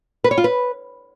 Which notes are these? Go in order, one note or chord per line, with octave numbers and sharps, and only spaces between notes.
B4
C#5
F4
B4